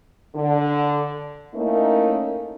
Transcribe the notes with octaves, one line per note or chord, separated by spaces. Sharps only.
D3
A3 A#3 C#4 D#4 E4